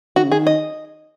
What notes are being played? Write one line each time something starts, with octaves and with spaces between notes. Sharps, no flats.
D#3 F#4
C#3
D#3 G#4
D#5